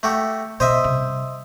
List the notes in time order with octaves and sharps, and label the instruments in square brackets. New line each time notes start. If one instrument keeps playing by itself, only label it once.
[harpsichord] A3 F#4 G4
[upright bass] B2 B3 [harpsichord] C5 D#5 E5
[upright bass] C3 G3